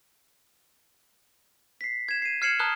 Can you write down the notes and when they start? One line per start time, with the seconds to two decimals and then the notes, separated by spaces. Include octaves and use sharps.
1.81 B6 C7
2.09 G#6 E7
2.22 C7 D#7
2.42 F6 G#6 C7 C#7 E7 F#7
2.59 A5 A#5 D#6 F6 F#6 G7